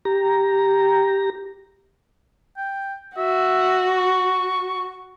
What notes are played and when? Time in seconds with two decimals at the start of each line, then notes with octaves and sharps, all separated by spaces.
0.05 G4 A#5
2.57 G5
3.17 F#4 E5
3.97 C#6